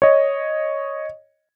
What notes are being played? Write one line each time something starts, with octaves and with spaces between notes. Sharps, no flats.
C#5 D#5